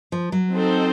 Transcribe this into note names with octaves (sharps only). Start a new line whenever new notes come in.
F3
F#3
C4 D#4 A4 C5